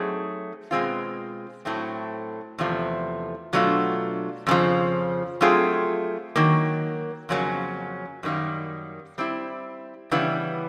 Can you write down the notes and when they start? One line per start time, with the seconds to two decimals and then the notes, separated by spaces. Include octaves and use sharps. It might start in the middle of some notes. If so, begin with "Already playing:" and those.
Already playing: F#3 A3 C4 D#4 G#4
0.71 B2 G#3 C4 F4
1.65 A2 F#3 A3 C4
2.58 E2 C3 F3 A3
3.53 B2 F#3 A3 D4 F4
4.47 F2 C#3 F3
5.41 F#3 A3 C4 F4 G#4
6.36 D#3 F#3 A#3
7.29 F2 C#3 F#3 A#3 C#4
8.23 F#2 D#3 G3 A#3
9.18 G3 C4 E4
10.11 C#3 E3 G3 B3 E4